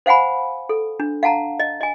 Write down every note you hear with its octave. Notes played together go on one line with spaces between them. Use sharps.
C5 F5 F#5 G#5 B5
A4
D4
F5 F#5 A5 A#5
D#5
D#5 G#5